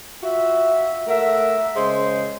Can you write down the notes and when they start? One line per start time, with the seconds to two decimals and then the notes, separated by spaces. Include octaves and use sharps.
0.23 F4 F#4 E5
1.08 A3 A#4 E5 F#5
1.76 C#3 G#3 C5 C6